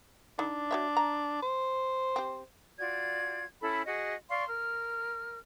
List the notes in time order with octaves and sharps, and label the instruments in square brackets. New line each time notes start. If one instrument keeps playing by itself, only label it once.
[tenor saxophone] D4 [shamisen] D#4
[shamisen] F#4 C#5 E5
A#5
[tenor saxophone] C5
[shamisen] C4 G4
[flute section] F4 F#4 D5 G#6
C#4 E4 A4 B5
F#4 G#4 D#5
D5 F5 C6 C#6
A#4 F6